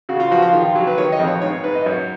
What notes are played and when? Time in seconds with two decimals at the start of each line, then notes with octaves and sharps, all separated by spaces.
0.09 C#3 F#4
0.20 F4
0.31 F3 F#4
0.42 F4
0.53 D#3 F4
0.65 F4
0.75 F#3
0.87 B4
0.98 D#3 C#5
1.12 D#5
1.20 F2
1.27 C#5
1.42 G#2 C#5
1.53 C#5
1.64 G#2 B4
1.75 D#5
1.86 F#2 C#5